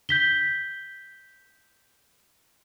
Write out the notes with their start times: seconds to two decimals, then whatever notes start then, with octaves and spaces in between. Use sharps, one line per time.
0.09 G6 B6 G7